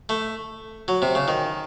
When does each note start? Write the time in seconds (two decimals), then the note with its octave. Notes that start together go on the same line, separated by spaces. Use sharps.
0.09 A3
0.88 F#3
1.02 C3
1.15 C#3
1.28 D#3